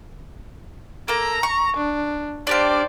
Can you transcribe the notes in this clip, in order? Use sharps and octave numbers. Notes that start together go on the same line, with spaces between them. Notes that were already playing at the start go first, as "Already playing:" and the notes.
A#3 A4 A#5
C#6
D4
D4 G4 C5 D5 F5